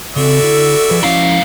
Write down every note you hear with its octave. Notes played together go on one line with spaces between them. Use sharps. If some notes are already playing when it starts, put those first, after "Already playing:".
C#3 C4 F#4 A4 D5 E5
D3 E4
F3 G#4 B4
G#2 F3 C#4 E4 F5